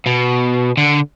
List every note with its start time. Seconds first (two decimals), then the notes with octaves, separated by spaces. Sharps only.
0.06 B2
0.77 D3